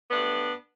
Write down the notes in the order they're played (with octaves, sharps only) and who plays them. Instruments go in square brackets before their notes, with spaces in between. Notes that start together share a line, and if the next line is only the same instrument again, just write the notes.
[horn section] G2 F#3 A3 B3 D4